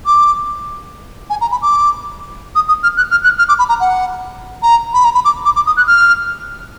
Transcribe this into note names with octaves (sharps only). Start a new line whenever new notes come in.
D6
G#5
A#5
B5
D6
D#6
D#6
F6
F#6
F6
F#6
F6
D6
B5
A#5
F#5
A#5
B5
A#5
B5
D6
D6
D6
D#6
F#6
F6